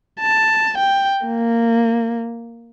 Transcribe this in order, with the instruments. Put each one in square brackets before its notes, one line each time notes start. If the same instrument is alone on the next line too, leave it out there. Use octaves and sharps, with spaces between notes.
[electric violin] A5
G5
A#3